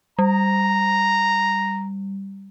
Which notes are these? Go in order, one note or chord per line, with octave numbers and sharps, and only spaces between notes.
G3 A#5